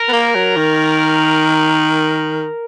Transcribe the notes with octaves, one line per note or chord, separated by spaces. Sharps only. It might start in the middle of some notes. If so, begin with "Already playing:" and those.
Already playing: A#4
B3
A#3
F#3
D#3